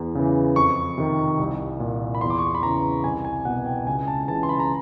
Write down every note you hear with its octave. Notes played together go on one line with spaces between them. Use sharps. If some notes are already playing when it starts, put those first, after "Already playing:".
Already playing: E2
C#3 E3
F2 C#6
C3 D#3
C2
A#2
B5
E2 C6
D6
C#6
C6
B5
C#3 E3 A#5
C2 G#5
G#5
B2 F#5
G5
C#2 G#5
A5
C#3 E3 A5
C6
B5
A#5